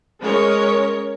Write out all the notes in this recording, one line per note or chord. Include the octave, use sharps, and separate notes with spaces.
G#3 C#4 A#4 C#5